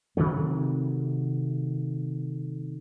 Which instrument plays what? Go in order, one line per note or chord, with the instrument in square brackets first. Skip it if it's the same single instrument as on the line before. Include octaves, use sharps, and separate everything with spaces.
[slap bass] C3 D#3 F#3 A3